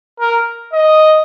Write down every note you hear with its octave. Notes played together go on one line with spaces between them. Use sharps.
A#4
D#5